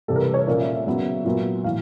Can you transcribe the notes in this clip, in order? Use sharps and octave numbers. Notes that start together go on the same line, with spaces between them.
C3 E3 G3 A4
A#4
B4
C#5
A#2 F3 A#3 C#4 D5
E5
E5
C#3 F#3 B3
A#2 F#3 B3
A2 E3 F5